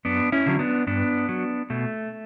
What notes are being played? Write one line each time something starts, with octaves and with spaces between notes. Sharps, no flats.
F#2 B3 D4
C#4 E4
D3 F#3
B3 D4
G2 B3 D4
F#3
B2 A3